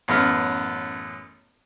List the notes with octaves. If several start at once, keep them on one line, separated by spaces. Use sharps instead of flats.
A1 F#2 B3 F6